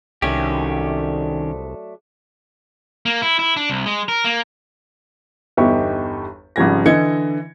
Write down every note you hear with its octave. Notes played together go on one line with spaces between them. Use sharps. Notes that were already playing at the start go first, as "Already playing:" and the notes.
C2 D#3 F#3 A3 C#4 D4 G4
A#3
E4
E4
D4
C2
G#3
A#4
A#3
G1 E2 D#4 G4 E5 C#6
G#1 C#3 F3 G3 G#6 A#6
D3 E3 D#5 G#6 C#7 G7